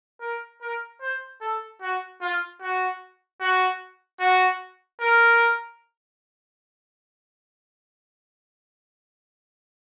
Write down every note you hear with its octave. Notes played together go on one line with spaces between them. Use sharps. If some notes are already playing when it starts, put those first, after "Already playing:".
A#4
A#4
C5
A4
F#4
F4
F#4
F#4
F#4
A#4